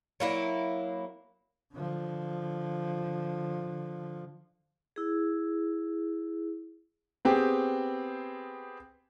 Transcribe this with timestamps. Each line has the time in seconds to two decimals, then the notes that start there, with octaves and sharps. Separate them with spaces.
0.20 F#3 A#3 E4
1.73 D3 F3
4.96 E4 G#4
7.25 B3 C4 G4 G#4